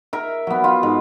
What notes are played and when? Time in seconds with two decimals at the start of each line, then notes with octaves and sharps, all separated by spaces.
0.13 A#4 E5
0.47 F#3 B3
0.64 F4
0.83 G#2